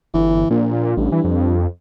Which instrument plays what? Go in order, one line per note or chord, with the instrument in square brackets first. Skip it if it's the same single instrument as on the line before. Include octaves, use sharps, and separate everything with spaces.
[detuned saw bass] G1 [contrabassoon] E3
[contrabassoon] A#1 [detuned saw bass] A#2
[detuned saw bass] A1 [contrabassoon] G2
[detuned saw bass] E3
F2